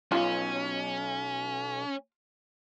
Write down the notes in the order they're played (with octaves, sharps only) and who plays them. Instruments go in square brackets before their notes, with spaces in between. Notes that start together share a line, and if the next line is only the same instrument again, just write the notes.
[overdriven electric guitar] B1 [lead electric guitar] C#4 [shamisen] F4 F5